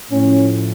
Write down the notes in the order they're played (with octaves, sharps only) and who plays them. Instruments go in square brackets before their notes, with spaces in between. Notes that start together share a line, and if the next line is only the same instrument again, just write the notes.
[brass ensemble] A2 F3 C#4